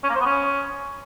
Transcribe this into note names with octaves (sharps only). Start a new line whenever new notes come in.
C#4
A#3
C5
B3
C#4